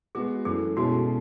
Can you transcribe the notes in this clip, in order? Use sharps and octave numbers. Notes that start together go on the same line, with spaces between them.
G#3 B3 F#4 G#4
F#2 E3 A3 G#4
B2 G#3 C#4 E4 F#4 A4